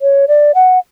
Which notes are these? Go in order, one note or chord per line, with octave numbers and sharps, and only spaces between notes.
C#5
D5
F#5